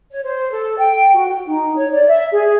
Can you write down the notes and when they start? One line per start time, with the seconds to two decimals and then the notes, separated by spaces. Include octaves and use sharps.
0.10 C#5
0.23 C5
0.51 A4
0.78 G5
1.14 F#4
1.28 G5
1.48 D#4
1.77 C#5
1.93 D5
2.08 E5
2.31 G#4